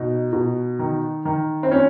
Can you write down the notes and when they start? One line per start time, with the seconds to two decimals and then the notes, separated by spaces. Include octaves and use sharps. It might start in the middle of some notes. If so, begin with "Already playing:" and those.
Already playing: B2 D#4
0.33 B2
0.79 D#3
1.25 D#3
1.63 C4
1.71 A#2 C#4